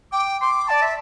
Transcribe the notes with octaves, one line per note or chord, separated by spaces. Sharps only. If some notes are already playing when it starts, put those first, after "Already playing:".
G5 D6
C6 D6
D5 A5
E5